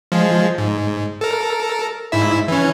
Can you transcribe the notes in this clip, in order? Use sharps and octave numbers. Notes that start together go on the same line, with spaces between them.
F3 G#3
G#2
A4 A#4
G#2 E4 E5
E3 C#4